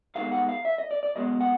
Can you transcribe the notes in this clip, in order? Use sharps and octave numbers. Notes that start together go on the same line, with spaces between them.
G2 D#3 G#3 B3 F5
F#5
F5
E5
D#5
D5
D5
B1 B2 G#3 B3 D#5
F#5